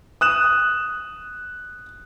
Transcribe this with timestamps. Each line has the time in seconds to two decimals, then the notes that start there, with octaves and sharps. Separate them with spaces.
0.21 D#6 F#6 E7